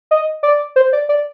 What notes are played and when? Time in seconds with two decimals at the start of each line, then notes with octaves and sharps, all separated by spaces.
0.11 D#5
0.43 D5
0.76 C5
0.93 D5
1.09 D5